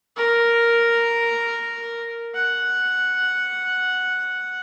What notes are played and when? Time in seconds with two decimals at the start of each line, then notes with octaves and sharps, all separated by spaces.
0.16 A#4
2.35 F#5